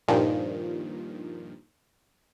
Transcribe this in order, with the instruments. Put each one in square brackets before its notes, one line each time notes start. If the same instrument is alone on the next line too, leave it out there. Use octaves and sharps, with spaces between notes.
[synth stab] G2 A#2 D#3 F3